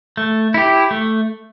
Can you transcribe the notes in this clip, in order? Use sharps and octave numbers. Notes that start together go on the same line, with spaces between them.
A3
E4 G4
A3